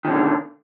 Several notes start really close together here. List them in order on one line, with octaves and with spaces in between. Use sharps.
D#3 B2 D3